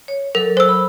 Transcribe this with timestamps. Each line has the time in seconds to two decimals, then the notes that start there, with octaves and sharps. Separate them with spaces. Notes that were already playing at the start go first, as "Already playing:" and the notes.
0.08 C#5
0.35 F#3 A4 A#4
0.57 C5 E6
0.69 B5